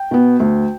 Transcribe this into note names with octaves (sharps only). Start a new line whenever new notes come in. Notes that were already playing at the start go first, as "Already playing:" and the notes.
Already playing: G5
B2 B3
D2